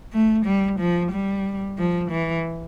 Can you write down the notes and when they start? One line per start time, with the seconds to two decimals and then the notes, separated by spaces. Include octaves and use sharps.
0.13 A3
0.45 G3
0.79 F3
1.11 G3
1.78 F3
2.11 E3